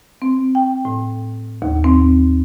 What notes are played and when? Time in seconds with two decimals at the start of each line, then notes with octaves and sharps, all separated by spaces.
0.22 C4
0.55 G5
0.85 A2
1.62 D#2
1.84 C4